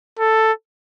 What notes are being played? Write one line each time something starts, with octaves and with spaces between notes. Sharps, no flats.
A4